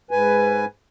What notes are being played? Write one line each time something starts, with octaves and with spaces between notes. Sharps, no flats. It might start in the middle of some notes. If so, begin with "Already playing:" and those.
G#2 B4 G#5